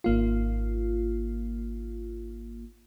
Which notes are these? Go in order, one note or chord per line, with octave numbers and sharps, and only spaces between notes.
G#1 A#3 F4